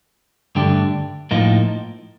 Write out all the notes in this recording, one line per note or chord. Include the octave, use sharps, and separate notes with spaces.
G2 D3 A3 D4 G4
A2 F3 A#3 D#4